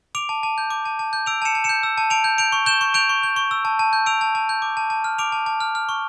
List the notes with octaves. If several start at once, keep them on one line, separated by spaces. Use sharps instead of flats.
D6 D7 F7
A5
A5
G6
D6
A5
A5
G6
E6 D7 F7
A5 C#7 E7
A5
C#7 E7
G6
E6
A5
A5 D7 F7
G6
G6 D7 F7
C#6
G6 E7 G7
C#6
G6 D7 F7
C#6
G6
C#6
E6
A5
A5
G6
E6 D7 F7
A5
A5
G6
D6
A5
A5
F6
D6 D7 F7
A5
A5
F6
F6
C#6